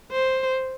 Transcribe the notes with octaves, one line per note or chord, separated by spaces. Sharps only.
C5